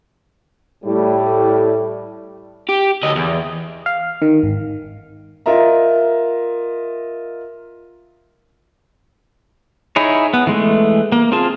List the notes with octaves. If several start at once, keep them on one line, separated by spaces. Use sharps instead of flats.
A2 G3
G4
D2 D#5
E2
F5
D#3
G#1
F4 A#4 D#5 E5 A#5
D#4 E4 G#4 C#5
B3
E3 G#3 A3
A#3
C4 F4 G#4 A5